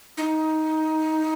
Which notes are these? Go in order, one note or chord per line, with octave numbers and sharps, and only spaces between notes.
D#4